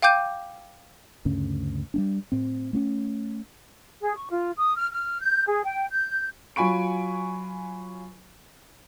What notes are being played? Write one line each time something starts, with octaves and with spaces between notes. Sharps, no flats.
F5 G5 D6 G6 D#7
D2 G2 C#3 C#4
G3 B3 D4
A2 C4
A3 C4 C#4
G#4
C#6
F4
D#6
F6
F6
G6
G#4
G5
G6
F#3 F4 G#5 B5 C#6 D7